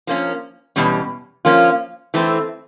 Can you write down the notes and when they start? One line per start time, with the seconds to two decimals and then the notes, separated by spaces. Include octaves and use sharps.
0.07 F3 A#3 C#4
0.76 E2 B2 G3 C#4
1.45 F3 A#3 C#4 F4
2.14 E3 A3 C4